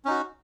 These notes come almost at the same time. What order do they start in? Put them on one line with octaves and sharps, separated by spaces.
C#4 D#4 F#4